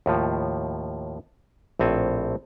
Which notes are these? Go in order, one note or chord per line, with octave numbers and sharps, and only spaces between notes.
D#2 A2 F3
A#1 A2 C4 A4 G#5